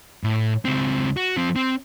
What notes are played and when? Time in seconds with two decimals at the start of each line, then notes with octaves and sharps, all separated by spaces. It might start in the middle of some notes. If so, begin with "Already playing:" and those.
0.24 A2
0.65 C#2 C4
1.17 F#4
1.37 F3 C4
1.56 C4